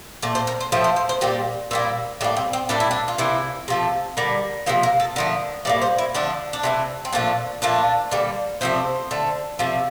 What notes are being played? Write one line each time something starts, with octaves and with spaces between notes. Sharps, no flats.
A#2 A3 D5
C5
A#4
C5
A2 F3 A3 C5
C5
C5
C5
A#2 G3 A#3 G4
A#2 G3 A#3 E4
A2 G3 A#3 D4
C4
C4
A2 G3 A#3 D4
E4
D4
F4
C3 E3 A#3 E4
C3 F3 A3
D3 G3 A#3 D5
C3 F3 A#3 C5
A#4
A4
D3 F3 A3 A#4
A2 G3 A#3 D5
C5
E4
D3 F3 A3 D4
D4
C3 E3 A3 C4
C4
A#2 F3 A3 D4
A#2 F3 A3 D4
D3 G3 A#3
C3 F3 A3 C5
D3 A3
C3 F3 A3